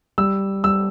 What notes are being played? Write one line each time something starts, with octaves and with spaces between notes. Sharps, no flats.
G3 E6
G3 E6